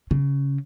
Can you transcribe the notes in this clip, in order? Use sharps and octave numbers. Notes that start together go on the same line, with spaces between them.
C#3